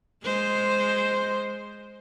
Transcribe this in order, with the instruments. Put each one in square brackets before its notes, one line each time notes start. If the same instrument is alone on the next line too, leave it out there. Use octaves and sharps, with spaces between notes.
[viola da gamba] G#3 C5